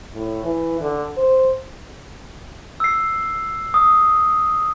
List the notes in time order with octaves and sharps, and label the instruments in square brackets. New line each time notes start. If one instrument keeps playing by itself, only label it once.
[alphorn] A2
E3
D3
C5
[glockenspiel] E6 C7
D#6